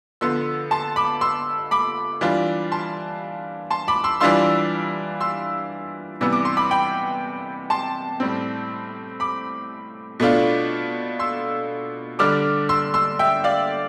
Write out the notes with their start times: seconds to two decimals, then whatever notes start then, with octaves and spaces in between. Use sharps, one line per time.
0.21 D3 F3 B3 C6 E6
0.71 A5 C6
0.96 B5 D6
1.21 C6 E6
1.71 B5 D6
2.21 E3 G3 D4 F4
2.72 A5 C6
3.70 A5 C6
3.88 B5 D6
4.04 C6 E6
4.20 E3 G3 D4 F4 C6 E6
5.21 C6 E6
6.21 C3 E3 G3 B3 E6
6.33 D6
6.45 C6
6.57 B5 D6
6.71 G5 B5
7.70 A5 C6
8.20 A2 G3 C4
9.20 B5 D6
10.20 B2 A3 D4 F4
11.20 C6 E6
12.19 D3 G3 D4 D6 F6
12.69 C6 E6
12.94 C6 E6
13.19 E5 G5
13.44 D5 F5